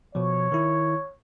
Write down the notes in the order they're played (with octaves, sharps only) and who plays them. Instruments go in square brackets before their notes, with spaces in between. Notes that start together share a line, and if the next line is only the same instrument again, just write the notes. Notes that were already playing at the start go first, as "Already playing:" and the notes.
[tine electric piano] B2 F3 [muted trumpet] C#5
[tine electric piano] D#3 E4